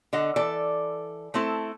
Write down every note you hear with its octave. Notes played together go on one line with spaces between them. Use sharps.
D3 D#5 F#5
E3 A4 D5
A3 C4 E4 A4